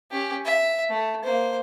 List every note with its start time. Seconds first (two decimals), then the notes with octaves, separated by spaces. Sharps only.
0.11 C#4 G4
0.45 E5
0.89 A3
1.24 A#3 C5